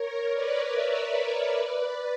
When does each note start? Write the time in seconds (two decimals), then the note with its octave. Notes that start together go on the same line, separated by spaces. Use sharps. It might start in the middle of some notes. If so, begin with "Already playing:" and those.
Already playing: A#4 C#5
0.33 B4 D5
0.73 C#5 E5
1.53 B4 D5